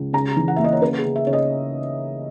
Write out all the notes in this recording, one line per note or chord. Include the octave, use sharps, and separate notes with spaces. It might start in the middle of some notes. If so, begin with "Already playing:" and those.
Already playing: C#2
C#3 A#5
E3
F#5
A#3 E5
D#5
C#5
C#3 B4
G#4
C#3
E5
C#3 C#5
D#5